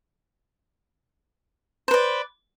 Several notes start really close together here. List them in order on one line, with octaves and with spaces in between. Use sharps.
C5 B4 D5